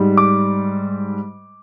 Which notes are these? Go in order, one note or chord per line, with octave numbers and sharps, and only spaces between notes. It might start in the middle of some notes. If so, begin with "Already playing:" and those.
Already playing: G#2 G3
D6